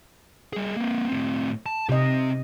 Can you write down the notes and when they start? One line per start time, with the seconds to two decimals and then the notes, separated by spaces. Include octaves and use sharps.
0.53 G3 G#4
0.77 A#3 C4
1.07 A2 C4
1.66 A5
1.89 C3 C4 G4 D#5